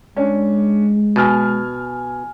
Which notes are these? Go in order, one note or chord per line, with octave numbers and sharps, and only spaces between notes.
G#3 C#4 D4
B2 G#5 F6